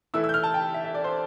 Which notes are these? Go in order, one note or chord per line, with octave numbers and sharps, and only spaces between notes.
E3 A3 E4 E6
E6
G6
F6
A5
G5
E5
E5
D5
C5